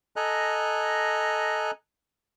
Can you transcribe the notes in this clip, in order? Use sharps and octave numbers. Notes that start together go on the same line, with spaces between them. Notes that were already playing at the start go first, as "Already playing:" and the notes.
A4 D#5 G#5 A#5 F#6